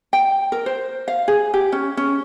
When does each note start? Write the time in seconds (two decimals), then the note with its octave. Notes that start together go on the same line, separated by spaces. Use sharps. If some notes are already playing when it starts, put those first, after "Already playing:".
0.13 G5
0.52 A#4
0.66 C5
1.08 F5
1.28 G#4
1.54 G4
1.72 C#4
1.97 C#4